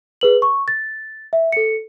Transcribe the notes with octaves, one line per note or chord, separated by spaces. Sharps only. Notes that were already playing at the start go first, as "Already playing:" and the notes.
G#4 B4 F#7
C#6
A6
E5
A4 C#7